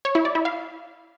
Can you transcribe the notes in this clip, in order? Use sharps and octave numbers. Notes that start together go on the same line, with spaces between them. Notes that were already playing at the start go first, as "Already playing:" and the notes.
C#5
E4
D5
E4
F5